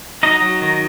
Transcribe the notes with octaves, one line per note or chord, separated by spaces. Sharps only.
F#3 D#4 D#5
F#3
D#3